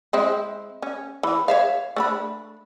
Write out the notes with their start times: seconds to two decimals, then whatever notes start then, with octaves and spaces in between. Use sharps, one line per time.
0.13 G#3 C4 E4
0.82 C#4
1.23 E3
1.48 C#5 E5 F5
1.96 A3 D4 B5